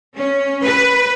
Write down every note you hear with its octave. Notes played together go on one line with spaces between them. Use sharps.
C#4
B4